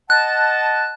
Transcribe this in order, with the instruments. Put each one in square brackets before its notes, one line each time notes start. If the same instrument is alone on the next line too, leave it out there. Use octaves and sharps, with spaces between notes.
[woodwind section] D#5 F#5 A5 [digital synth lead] F#6